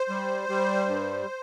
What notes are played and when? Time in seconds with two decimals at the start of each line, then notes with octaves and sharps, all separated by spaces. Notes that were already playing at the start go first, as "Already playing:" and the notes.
Already playing: C5
0.10 G3
0.49 G3
0.87 G2